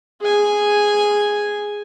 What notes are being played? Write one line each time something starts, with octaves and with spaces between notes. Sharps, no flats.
G#4 G#5